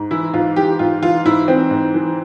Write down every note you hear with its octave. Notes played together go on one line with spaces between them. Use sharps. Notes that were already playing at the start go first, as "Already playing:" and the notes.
Already playing: G#2
E3 E4
G#2 F4
E3 G4
G#2 F4
E3 F4
G#2 E4
E3 C4
G#2
E3